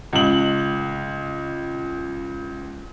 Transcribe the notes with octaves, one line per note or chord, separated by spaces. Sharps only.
C#2 F#7